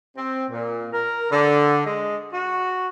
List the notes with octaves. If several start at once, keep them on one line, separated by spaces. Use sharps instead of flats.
C4
A#2
A#4
D3
G#3
F#4